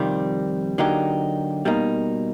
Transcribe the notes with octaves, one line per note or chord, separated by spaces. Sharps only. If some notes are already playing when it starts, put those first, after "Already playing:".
Already playing: F2 C3 D#3 G3 C4
D3 F#3 A#3 D#4 G4
B2 G3 A#3 D#4